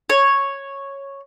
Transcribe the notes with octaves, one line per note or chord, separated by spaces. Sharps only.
C#5